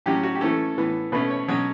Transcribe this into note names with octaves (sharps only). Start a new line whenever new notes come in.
A2 F#3 C#4 G4
F#4
G4
E3 A3 C#4 A4
A2 E3 B3
B2 A3 C#4 B4
C#5
B2 F#3 C#4 C#5